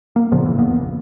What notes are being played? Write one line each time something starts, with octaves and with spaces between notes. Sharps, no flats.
A#3
A#2 C#3 F3 B3
E1 A1 G#2 E3
D#1 F2 A#3 B3
A#1